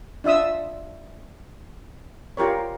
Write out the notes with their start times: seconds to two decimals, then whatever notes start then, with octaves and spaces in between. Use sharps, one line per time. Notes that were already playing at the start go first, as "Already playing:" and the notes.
0.24 D4 F4 E5 D#6 E6
2.37 F4 G4 A#4 C#5